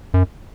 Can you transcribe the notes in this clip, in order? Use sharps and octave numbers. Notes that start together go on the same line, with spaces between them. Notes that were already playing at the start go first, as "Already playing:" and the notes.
F#2